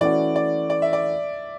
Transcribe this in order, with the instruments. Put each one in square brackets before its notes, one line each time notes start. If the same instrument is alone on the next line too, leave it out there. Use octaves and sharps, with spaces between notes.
[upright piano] E3 A3 C#4 F#4 [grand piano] D5
[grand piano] D5
D5
E5
D5